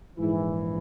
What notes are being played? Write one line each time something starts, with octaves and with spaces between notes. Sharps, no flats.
A#1 G#2 E3 E4